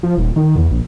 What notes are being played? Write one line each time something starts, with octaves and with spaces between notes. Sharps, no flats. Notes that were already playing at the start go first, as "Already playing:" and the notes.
F3
D#1
D#3
E2
A#1